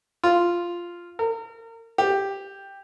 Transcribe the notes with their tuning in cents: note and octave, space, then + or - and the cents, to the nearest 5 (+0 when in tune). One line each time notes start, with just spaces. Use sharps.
F4 -5
A#4 -35
G4 +5